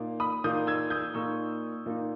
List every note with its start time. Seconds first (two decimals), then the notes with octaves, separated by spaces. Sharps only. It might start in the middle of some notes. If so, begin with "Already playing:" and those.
Already playing: A#2 A#3 D#4
0.20 B5 D#6
0.44 A#2 A#3 D#4 D#6 G6
0.67 E6 G#6
0.90 D#6 G6
1.14 A#2 A#3 D#4 C#6 E6
1.86 A#2 A#3 D#4